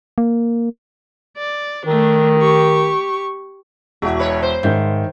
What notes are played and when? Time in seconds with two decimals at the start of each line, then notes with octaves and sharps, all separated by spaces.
0.18 A#3
1.37 D5
1.86 D#3 A3 D4
2.39 G4 C#6
4.02 E1 E4 F#4
4.19 B2 B4 C#5
4.42 C5
4.63 G#2 D#3 E5 G6